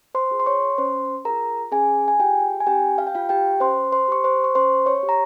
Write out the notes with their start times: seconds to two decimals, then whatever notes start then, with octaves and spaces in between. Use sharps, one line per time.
0.15 C5 C6
0.31 F4 G#4
0.40 C6
0.46 C#5 C#6
0.78 C#4 C5 C6
1.25 F4 G#4 A#4 A#5
1.72 C#4 G#4 G#5
2.08 G#5
2.19 F4 G4 G#4 G5
2.60 G#5
2.67 C#4 G4 G5
2.98 F5
3.07 G5
3.14 F4 G4 F5
3.29 G4 G5
3.60 C#4 C5 C6
3.92 C5 C6
4.08 G4 C#6
4.24 C5 C6
4.44 C#6
4.55 C#4 C5 C6
4.86 C#5 C#6
5.03 G4
5.09 A#5